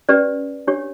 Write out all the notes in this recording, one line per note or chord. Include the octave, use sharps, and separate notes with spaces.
C#4 G4 B4 D5
D4 G4 C#5